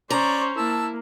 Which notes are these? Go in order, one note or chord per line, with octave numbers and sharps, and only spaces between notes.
C#4 C5 D5 A#5 C#6
A#3 E4 A5 E6